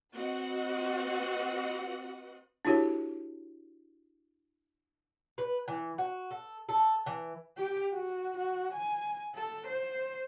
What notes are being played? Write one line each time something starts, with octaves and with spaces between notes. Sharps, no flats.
C4 F#4 B4 D#5 F#5
D4 E4 F#4 G4 A4 C#5
B4
E3
F#4
A4
A4
E3
G4
F#4
F#4
G#5
A4
C5